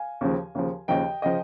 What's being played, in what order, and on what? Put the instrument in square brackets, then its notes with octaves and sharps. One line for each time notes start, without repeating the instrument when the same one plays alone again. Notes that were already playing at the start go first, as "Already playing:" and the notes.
Already playing: [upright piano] F5 G#5
D#2 C#3 F3
D#2 C#3 F3
D#2 C#3 F3 D#5 G5
C#3 F3 D#5 G5